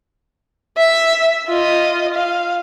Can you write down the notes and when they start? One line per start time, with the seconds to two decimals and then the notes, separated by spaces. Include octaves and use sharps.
0.78 E5
1.49 F4 D#5
2.14 F5